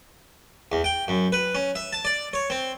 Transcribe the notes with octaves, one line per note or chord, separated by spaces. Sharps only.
E2
G5
F#2
B4
C#4
E5
A5
D5
C#5
C4